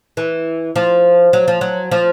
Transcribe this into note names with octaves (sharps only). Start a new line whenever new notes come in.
E3
F3
F#3
F3
F#3
F3